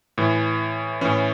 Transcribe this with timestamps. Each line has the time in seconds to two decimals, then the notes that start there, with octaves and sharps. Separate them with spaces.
0.18 A2 E3
1.01 A2 E3 C#4